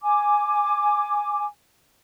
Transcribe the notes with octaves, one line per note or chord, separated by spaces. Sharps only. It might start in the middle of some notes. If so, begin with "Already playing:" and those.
G#5 D6